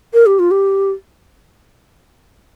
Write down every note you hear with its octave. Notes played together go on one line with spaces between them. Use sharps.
A#4
G4
F4
G4